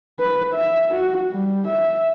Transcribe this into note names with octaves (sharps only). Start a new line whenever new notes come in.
B4
E5
F#4
G3
E5